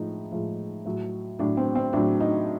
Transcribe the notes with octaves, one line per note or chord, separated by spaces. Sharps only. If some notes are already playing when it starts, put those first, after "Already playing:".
Already playing: A2 F3 G#3 D#4
A2 F3 G#3
A2 F#3
A2 F#3 D4
C4
C4
A2 F#3 D4
D#4